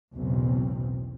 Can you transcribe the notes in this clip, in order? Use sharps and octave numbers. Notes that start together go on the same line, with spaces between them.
B1 E2 A2 C#3 C4